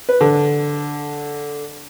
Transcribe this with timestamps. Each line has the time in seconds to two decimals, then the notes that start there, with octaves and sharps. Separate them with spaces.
0.09 B4
0.21 D3